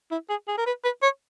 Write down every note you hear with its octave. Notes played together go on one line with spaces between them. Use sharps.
E4
G#4
G#4
A#4
B4
B4
C#5